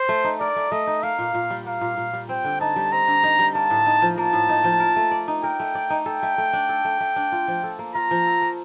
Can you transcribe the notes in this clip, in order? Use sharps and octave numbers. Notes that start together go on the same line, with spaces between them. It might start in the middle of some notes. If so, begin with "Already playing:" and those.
Already playing: C5
A3
D#4
A#4 D5
A3
A3 D#5
D#4
A#3 F5
A#2
A#2
G3
A#3 F5
A#2
A#2
G3
C4 G5
D3
D#4 A5
G3
C4 A#5
D3
D#4
G3
A#3 A5
A2
D#4
F3
A#3 A5
A2
D#4
F3
A#4
A3
D5
D#4
A#4 G5
A3
D5
D#4
A4 G5
A3
A3
D4
A4
A3
A3
D4
F4
F3
A4
A#3
F4 A#5
F3
A4
A#3